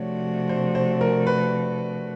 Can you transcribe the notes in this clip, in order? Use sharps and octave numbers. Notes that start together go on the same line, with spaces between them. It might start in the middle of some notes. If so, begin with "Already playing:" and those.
Already playing: C3 F3 A3 D4 F#4 C#5
C5
C5
A#4
B4